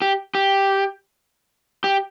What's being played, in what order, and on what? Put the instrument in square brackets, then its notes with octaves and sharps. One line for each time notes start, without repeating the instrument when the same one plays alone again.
[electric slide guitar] G4
G4
G4